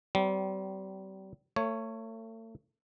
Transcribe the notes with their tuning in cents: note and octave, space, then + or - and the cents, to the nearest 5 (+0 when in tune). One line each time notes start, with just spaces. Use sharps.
G3 -40 C4 -30
A3 +40 C#5 +0